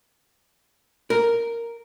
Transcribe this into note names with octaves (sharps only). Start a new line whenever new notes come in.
A#4